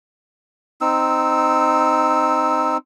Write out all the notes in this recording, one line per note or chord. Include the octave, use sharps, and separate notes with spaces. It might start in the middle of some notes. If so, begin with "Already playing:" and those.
C4 D#4 E6